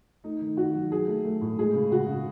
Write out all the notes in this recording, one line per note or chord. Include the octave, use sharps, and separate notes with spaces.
A3 D#4
D#3
D#3 F#4
F#3
F#3 G#4
A3
A3
A2
G#3 G#4
C#3
C#3 F#4
C#3